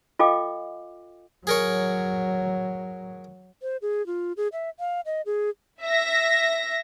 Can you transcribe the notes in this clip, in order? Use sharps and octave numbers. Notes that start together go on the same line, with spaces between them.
F4 A4 D#5 F5 G5 D6
F#3 G#4 A#4 C#5
C5
G#4
F4
G#4
E5
F5
D#5
G#4
E5 A#6